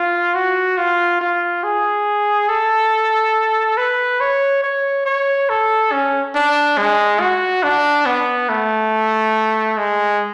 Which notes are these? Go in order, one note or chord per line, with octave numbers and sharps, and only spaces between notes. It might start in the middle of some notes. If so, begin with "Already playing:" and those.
Already playing: F4
F#4
F4
F4
G#4
A4
B4
C#5
C#5
C#5
A4
C#4
D4
G#3
F#4
D4
B3
A3
G#3